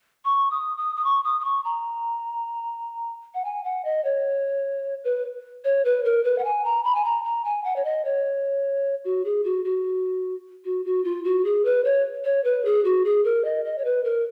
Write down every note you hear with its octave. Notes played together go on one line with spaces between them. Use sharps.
C#6
D#6
D#6
D#6
C#6
D#6
D#6
C#6
A#5
F#5
G#5
F#5
D#5
C#5
B4
C#5
B4
A#4
B4
F#5
G#5
A#5
B5
G#5
A#5
A#5
G#5
F#5
C#5
D#5
C#5
F#4
G#4
F#4
F#4
F#4
F#4
F4
F#4
G#4
B4
C#5
C#5
B4
G#4
F#4
G#4
A#4
D#5
D#5
C#5
B4
A#4